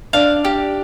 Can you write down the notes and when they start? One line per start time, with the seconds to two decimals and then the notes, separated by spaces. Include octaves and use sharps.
0.13 D4 D5 F5
0.45 G4